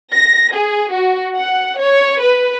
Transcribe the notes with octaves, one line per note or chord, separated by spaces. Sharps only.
A#6
G#4
F#4
F#5
C#5
B4